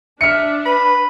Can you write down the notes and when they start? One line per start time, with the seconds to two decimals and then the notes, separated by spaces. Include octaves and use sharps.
0.21 D4 E5 F6 C#7
0.66 B4 B5